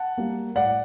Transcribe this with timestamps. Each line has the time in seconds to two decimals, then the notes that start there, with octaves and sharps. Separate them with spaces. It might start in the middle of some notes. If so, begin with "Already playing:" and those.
Already playing: F#5 A5
0.18 G3 A#3
0.56 A2 D5 F#5